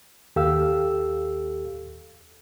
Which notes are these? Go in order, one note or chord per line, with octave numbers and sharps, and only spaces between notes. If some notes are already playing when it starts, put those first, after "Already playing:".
D#2 G4 A4 F5 E6